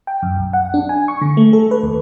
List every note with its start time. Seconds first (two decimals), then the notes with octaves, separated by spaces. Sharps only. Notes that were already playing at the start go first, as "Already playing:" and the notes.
0.07 G5
0.22 F#2
0.37 B1
0.53 F#5
0.74 D4
0.89 G#5
1.08 C#6
1.21 D3
1.37 A3
1.53 A4
1.71 B4
1.83 D#2